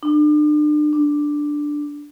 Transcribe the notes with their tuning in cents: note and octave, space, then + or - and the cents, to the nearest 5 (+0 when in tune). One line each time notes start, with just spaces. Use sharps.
D4 +35
D4 +5